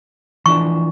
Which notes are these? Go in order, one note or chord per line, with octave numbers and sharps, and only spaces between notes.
E3 F3 D4 C#6